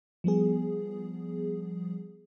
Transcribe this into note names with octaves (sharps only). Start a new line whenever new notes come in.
F3 G3 B3 G#4